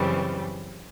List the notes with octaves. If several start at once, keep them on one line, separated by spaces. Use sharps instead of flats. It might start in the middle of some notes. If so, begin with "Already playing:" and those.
Already playing: F#2 C#3 E3 G3 C4